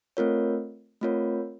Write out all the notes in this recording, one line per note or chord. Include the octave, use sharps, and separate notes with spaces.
A3 C4 F4 A#4 C#5
A3 C4 F4 A#4 C#5